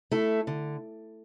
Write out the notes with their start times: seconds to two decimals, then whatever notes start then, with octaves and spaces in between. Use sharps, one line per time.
0.11 A3 E4 A4
0.47 D3